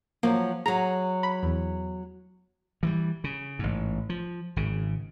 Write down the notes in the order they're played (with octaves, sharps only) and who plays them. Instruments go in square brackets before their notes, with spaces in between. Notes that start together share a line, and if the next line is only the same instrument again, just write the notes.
[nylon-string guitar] F3 F#3 [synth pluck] A#3
[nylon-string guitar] F#3 G#4 [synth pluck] A#5
[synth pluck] B5
E2
[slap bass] E3 F#3 G3
C#3
A1 G#2
F3
G#1 C#3